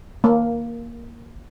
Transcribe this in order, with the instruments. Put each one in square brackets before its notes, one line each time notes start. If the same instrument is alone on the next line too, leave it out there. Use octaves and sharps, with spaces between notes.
[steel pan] A#3